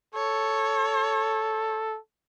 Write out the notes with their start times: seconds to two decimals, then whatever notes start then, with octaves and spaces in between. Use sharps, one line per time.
0.15 A4 C#5